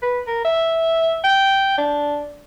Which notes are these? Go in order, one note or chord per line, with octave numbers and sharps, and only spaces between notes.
B4
A#4
E5
G5
D4